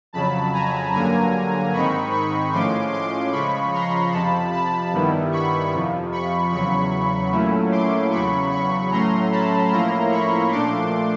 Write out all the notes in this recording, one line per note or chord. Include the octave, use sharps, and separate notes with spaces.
F2 C#3 F#3 A5 B5
G#5 A#5
G2 D3 F#3 A#3 G#5 A#5
G#2 D#3 G#3 C4 D#4 B5 C#6
B5 C#6
A2 F3 G#3 C#4 C6 D6
C6 D6
C#3 F3 G#3 B5 C#6
A#5 C6
F2 C3 F3 A5 B5
A5 B5
G2 D#3 G3 B3 E4
B5 C#6
F2 C3 F3
B5 C#6
E2 C#3 F#3 B5 C#6
A#2 F#3 A3 C#4 E4
C6 D6
E2 C#3 F#3 B5 C#6
B5 C#6
A2 F#3 A3 C#4 A#5 C6
A5 B5
A2 F3 A#3 C#4 E4 A#5 C6
B5 C#6
A#2 F3 A3 D4 C6 D6